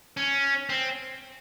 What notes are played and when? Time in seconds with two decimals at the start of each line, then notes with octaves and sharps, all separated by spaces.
0.17 C#4
0.70 C4